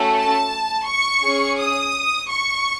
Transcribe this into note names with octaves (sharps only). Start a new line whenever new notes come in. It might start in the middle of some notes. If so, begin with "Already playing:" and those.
Already playing: A3 C#4 F#4 A4
A5
C#6
C#4 G#4
D#6
C#6